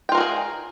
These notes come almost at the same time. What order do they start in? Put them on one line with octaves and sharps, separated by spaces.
G5 F4 A#4 F#4 G#4